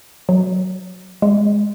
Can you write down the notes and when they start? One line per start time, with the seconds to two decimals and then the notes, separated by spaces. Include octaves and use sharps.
0.29 F#3
1.22 G#3